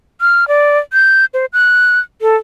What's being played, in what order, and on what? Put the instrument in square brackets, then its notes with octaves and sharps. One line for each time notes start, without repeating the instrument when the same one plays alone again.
[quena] F6
D5
G6
C5
F#6
A4